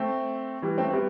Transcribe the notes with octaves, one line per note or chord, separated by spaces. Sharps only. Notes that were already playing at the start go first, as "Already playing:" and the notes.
Already playing: A3 C4
E3 G3
A3 C4
C4
G3 B3